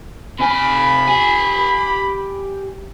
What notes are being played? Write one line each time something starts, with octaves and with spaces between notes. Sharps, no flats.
C3 G#5 B5
G4 G#5